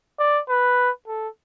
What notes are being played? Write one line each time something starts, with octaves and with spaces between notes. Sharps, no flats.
D5
B4
A4